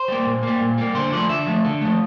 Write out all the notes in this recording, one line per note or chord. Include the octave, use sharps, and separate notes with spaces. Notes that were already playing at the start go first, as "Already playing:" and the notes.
Already playing: C5
G3 A#3
A#2
G3 A#3
A#2
G3 A#3
D3 C5
F3 A3 D5
D3 E5
F3 A3
D3
F3 A3